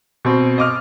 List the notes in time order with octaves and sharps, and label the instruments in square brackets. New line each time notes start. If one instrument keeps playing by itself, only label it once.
[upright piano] B2 C4
D#5 D6 F6